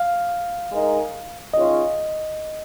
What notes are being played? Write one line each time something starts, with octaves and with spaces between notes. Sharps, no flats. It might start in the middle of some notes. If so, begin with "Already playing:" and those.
Already playing: F5
G#3 D#4 A#4 D#5
D#3 G#3 C#4 F4 C#5 D#5